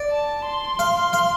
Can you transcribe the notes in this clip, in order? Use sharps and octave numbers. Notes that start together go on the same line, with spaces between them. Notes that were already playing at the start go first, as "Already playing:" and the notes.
Already playing: D5
A5
C6
F5
F5